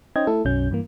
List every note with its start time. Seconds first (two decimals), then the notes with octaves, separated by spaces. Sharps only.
0.16 C#4 D#4 C5 D#5 G5 G#6
0.27 A3 E4 A4
0.45 B1 F#2 F#3 C#4 G6
0.71 G2 E3 A#3